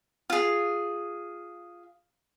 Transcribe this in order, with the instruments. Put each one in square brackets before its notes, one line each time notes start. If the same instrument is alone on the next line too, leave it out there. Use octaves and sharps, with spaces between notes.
[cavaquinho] F4 G#4